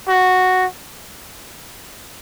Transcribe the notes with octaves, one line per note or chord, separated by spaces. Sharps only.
F#4